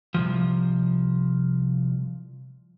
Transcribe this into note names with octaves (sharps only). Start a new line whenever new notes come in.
C2 G#2 F3